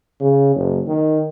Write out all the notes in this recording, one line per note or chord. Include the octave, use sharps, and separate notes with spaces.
C#3
F#1
D#3